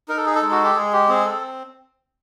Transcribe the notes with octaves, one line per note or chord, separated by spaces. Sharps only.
D#4 A#4
A4
G#4
A4
G#3
F#4
G4
G#3 G#4
G4
C4 G#4
A4